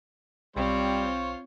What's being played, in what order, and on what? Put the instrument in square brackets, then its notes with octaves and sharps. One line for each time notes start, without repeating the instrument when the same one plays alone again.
[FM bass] B1 [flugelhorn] G3 [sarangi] C4 [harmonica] F4 C5 C#5